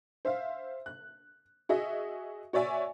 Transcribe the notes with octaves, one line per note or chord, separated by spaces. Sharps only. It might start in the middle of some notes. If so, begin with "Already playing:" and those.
C5 E5 F5
F#6
F#4 G#4 D#5 E5
F#4 C#5 D5 E5 G#5